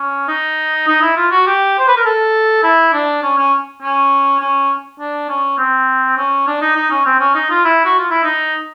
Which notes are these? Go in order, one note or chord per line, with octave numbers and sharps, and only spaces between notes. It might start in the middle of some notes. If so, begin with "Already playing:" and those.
Already playing: C#4
D#4
D#4
E4
F4
F#4
G4
C5
B4
A#4
A4
E4
D4
C#4
C#4
C#4
C#4
D4
C#4
C4
C#4
D4
D#4
D#4
C#4
C4
C#4
D#4
F4
E4
F#4
F4
E4
D#4